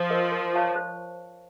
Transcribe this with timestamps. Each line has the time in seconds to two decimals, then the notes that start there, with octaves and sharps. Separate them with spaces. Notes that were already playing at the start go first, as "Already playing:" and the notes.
Already playing: F3
0.10 A#4 D#5
0.32 A#4
0.53 C#5 F5 A5 C#6
0.76 C5